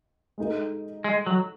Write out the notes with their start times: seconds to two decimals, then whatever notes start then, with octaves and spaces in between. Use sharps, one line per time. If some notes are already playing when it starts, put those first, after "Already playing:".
0.38 G#3 D#4 A4
1.04 G#3
1.27 F#3